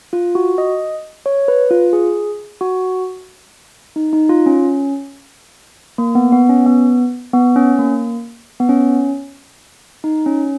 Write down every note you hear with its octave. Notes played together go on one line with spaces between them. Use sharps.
F4
F#4
D#5
C#5
B4
F4
G#4
F#4
D#4
D#4
F4
C#4
A#3
B3
B3
C#4
B3
B3
C#4
A#3
B3
C#4
D#4
C#4